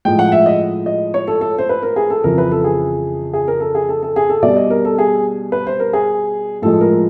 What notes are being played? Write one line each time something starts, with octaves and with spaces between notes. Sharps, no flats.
A2 F3 G#3 G5
F#5
E5
D#5
D#5
C#5
A4
A4
C5
B4
A#4
G#4
A4
F2 C#3 E3 A#4
B4
A4
G#4
G#4
A#4
A4
G#4
A4
A4
G#4
A4
B2 G3 D5
D#5
A#4
A4
G#4
B4
C5
A#4
G#4
A2 F3 G#3 A4
A#4